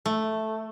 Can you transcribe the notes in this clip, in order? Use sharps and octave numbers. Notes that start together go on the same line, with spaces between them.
A3